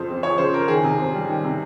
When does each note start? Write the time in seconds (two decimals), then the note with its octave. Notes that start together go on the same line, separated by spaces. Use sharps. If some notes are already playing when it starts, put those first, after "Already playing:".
Already playing: F2 C#3 C5
0.09 C4
0.23 F3 C#5
0.38 C#3 C5
0.54 F2 A#4
0.68 D#3 G#4
0.84 C3
0.98 C4
1.14 G3
1.29 D#3
1.44 C3